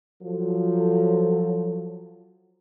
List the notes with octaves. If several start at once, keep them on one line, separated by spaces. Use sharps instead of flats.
F3 F#3 A4